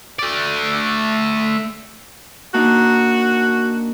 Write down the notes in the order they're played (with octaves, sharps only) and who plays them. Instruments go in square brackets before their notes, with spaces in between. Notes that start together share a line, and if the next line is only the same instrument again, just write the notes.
[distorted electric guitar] A3 D5
[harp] A#3 D4 D#4 [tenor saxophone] F#4